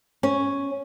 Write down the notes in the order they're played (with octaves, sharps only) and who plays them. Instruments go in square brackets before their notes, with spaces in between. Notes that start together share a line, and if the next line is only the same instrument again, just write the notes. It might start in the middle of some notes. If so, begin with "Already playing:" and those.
[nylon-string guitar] C#4